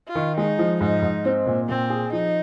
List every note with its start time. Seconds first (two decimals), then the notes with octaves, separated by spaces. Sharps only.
0.08 F4
0.15 D#3
0.36 G#3 D#4
0.59 F3
0.81 G#2 D#4
1.02 G#2
1.25 C4
1.46 A#2
1.69 A#2 C4
1.90 G#4
2.13 F3 D#4